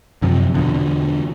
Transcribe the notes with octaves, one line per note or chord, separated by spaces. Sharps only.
F#2 C3 F3
E2 B2 D3